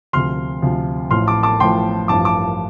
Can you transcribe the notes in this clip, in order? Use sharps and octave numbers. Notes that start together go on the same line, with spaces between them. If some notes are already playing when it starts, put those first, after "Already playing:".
D2 C3 F3 C6 F6
D2 C3 F3
A1 A2 F3 C6 F6
A5 D6
A5 D6
A1 A2 F3 G5 C6
A1 G2 F3 A5 D6
A5 D6